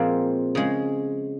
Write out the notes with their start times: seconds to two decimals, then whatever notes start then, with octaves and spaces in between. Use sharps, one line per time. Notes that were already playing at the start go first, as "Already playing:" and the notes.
Already playing: A#2 F3 G#3 C4
0.55 C#3 G#3